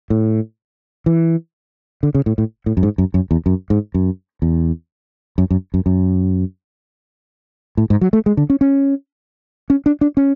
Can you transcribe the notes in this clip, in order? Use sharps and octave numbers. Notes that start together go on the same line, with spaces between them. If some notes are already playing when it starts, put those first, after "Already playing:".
A2
E3
D3
C#3
A2
A2
A2
F#2
G#2
F#2
F#2
E2
F#2
G#2
F#2
E2
F#2
F#2
F#2
F#2
A2
G#2
F#3
A3
G#3
D3
C#4
C#4
C#4
D4
D4
C#4